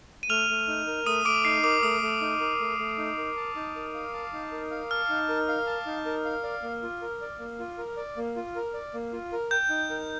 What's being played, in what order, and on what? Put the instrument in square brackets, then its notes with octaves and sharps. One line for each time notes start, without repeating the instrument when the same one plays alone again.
[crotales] D#7
[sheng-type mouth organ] A3 [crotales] F6 F7
[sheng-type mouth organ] A3
D#4
A#4
[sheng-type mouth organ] A3 [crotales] D#6 D#7
[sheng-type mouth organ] A3 [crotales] D6 D7
[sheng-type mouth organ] D#4 [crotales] C7
[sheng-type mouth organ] A#4 [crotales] D6
[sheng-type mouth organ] A3 [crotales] D#6
[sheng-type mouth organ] A3
D#4
A#4
A3
A3
D#4
A#4
A5
D#4
A#4
F5
A5
D#4
A#4
F5
[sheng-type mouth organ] A5 [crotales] F6
[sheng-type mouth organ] D#4
A#4
F5
A5
D#4
A#4
F5
D5
A#3
F4
A#4
D5
A#3
F4
A#4
D5
A#3
F4
A#4
D5
A#3
F4
A#4
[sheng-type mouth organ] G5 [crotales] G6
[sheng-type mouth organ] D#4
A#4